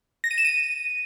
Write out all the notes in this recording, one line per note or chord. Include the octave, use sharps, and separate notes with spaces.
A#6
D#7
E7
D#7